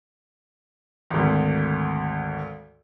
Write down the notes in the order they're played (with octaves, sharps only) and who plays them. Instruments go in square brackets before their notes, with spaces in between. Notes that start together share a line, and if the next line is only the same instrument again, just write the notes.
[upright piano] G#1 D2